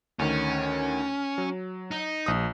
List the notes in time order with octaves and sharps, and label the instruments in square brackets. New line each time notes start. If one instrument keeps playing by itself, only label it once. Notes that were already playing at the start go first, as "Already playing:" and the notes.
[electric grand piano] D2 D#3 [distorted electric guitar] C#4
[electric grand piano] F#3
[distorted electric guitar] D#4
[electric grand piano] A#1 D#6